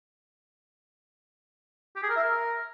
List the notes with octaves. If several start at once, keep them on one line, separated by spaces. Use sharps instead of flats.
G4
G#4
A#4
E5
A#4